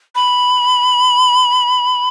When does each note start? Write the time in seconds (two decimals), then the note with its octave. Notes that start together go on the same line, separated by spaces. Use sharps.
0.15 B5